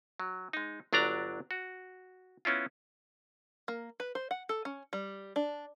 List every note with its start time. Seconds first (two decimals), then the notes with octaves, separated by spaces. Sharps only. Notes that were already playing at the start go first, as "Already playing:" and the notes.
0.20 F#3
0.53 G#3 D#4
0.93 G1 F#3 D4 D5 A#5
1.51 F#4
2.45 B3 C#4 E4 F4
3.68 A#3
4.00 B4
4.15 C5
4.31 F#5
4.49 A4
4.65 C#4
4.93 G3
5.36 D4